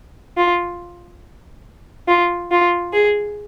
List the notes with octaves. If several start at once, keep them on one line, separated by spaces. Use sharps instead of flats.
F4
F4
F4
G#4